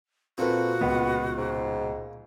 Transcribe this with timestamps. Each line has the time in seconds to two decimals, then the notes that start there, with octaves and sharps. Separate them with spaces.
0.38 A#2 C4 F#4 A4 B4
0.81 C#2 B2 B3
1.38 G#2